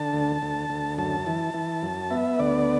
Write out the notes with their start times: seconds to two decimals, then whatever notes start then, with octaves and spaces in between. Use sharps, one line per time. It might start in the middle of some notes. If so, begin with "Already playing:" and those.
Already playing: D3 A5
0.13 D2
0.42 D2
0.70 D2
0.98 F#2 A5
1.26 E3
1.54 E3
1.83 F#2
2.10 B3 E5
2.39 D2 D5